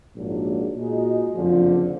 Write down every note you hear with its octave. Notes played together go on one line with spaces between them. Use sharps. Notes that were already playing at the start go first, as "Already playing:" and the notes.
A#1 G#2 F#3 A#3 D4
A#2 G#3 D#4 F#4
F#1 F2 D3 F3